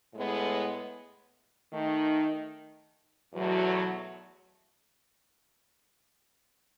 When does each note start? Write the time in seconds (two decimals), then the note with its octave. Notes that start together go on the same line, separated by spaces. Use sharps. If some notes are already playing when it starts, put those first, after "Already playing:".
0.13 A2 G#3 B3
1.73 D#3 A3 D#4
3.33 E2 B2 F#3 A3